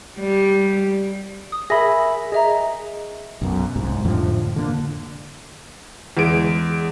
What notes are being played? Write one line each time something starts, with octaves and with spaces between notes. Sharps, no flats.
G3
D#6
G#4 A#4 E5 B5 A#6
G#4 D#5 E5 A#5
B1 F#2 B2
C2 G#2
F2 A2 D3 F3
D3 A#3
E2 G#3 D7